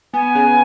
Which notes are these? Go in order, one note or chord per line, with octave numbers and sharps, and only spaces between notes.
B3 G#5
C#3